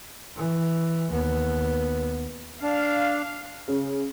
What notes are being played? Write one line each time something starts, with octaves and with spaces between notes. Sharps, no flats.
E3
D#2 B3
D4 F5
C#3